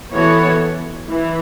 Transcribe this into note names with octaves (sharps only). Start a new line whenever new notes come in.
E3 B3 F#4 A4 C#5
E3